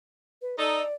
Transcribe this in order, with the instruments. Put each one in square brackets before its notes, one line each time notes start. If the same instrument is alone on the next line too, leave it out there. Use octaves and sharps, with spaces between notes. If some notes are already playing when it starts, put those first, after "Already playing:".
[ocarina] B4
[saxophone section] D#4 A4 [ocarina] D5